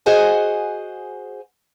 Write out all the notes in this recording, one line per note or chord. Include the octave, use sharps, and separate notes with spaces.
F#4 G#4 C5 D#5 F#5 G#5